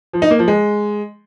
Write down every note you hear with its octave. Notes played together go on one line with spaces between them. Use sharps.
F3
D#4
A#3
F3
G#3